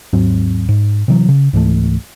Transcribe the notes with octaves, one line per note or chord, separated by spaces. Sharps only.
D#2 G#2 F#3 C4
G#2
C3 E3 F#3
C#3
C#2 G#2 E3 A3